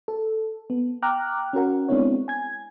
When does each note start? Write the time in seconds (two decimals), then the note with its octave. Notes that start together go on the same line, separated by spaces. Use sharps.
0.08 A4
0.70 B3
1.02 G5 A#5 D6 F6 F#6
1.53 C#4 F#4 A#4 F#5
1.88 G#3 B3 C4 D4 E4 C#5
2.28 G#5 G#6